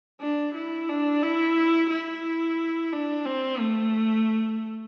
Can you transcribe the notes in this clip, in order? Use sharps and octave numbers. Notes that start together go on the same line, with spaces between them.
D4
E4
D4
E4
E4
D4
C4
A3